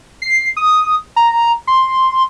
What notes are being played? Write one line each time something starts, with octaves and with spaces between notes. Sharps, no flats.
C7
D#6
A#5
C6